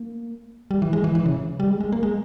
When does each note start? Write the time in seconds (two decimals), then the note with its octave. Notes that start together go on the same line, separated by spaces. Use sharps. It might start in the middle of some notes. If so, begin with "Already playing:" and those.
Already playing: A#3
0.71 G3
0.82 E3
0.93 G#3
1.04 E3
1.15 E3
1.26 C#3
1.60 G3
1.70 G#3
1.81 G#3
1.92 A#3
2.03 G#3